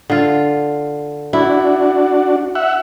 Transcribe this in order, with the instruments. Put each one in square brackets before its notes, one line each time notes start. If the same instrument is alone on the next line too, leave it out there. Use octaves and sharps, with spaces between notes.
[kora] D3 F4
[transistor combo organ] D4 F#4 [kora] E4
[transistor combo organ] E5 F#5